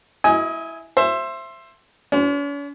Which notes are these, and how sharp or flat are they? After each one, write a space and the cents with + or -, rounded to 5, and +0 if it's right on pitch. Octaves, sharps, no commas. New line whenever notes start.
E4 +0 D#5 +30 G#5 +0
C5 +15 E5 +20
C#4 +45 C5 -15